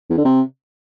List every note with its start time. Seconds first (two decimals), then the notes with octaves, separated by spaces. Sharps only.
0.10 E2
0.17 D3
0.25 C3